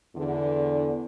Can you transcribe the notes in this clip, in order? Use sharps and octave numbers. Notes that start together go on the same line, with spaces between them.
E2 D3